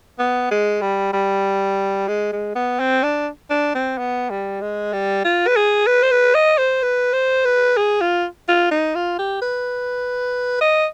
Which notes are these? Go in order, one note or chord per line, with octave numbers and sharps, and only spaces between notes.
B3
G#3
G3
G3
G#3
G#3
B3
C4
D4
D4
C4
B3
G3
G#3
G3
F4
B4
G#4
B4
C5
B4
D#5
C5
B4
C5
B4
G#4
F4
F4
D#4
F4
G4
B4
D#5